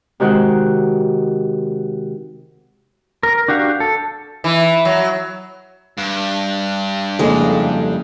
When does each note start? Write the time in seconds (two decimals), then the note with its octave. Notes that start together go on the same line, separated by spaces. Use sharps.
0.20 C3 D#3 G#3 F#4 C5 F#5
3.23 A#4
3.48 D4 F#4 G4 F5
3.80 A4
4.44 E3
4.85 F#3
5.98 G2
7.19 F2 A2 C#3 G#3 A#3